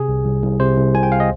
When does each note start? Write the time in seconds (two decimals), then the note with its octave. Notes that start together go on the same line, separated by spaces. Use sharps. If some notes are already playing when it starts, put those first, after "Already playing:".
Already playing: C3 G#4
0.09 C2
0.26 C2
0.43 C2
0.60 C3 C5
0.77 C2
0.95 C2 G#5
1.03 G5
1.12 F5
1.20 D#5